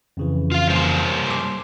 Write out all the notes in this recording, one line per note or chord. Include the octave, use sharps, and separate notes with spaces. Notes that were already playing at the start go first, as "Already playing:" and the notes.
F2 C#3 E3
F4 F5
G3 A#3 C5
C6 D6